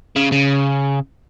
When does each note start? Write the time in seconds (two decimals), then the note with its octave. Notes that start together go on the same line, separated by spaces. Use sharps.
0.16 C#3
0.32 C#3